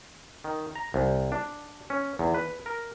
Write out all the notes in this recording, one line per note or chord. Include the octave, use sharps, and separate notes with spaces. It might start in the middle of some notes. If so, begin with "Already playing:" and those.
D#3
A#5
C2
D4
C#4
E2
B4
A#4